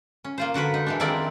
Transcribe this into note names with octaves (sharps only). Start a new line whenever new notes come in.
C#4
A#3 F4 C5
D3 F#4 A#4 B4
D#4
E3 G#3 D4
D#3 F3 C4 E4 A#4 D5